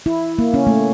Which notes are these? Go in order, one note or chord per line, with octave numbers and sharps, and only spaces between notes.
E4
A#3
C#4
A3